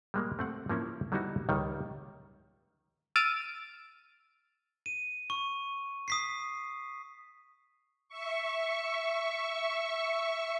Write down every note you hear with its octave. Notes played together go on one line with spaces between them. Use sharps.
G3 G#3 A#3
A3 C4 F#5
F3 A#3 C#4 E4
F#3 G3 B3 D#4 E4 F#4
C#2 D#3 G3
E6 F6 A6 D7 D#7
D#7
C#6
D#6 B6 C7
E5 C#6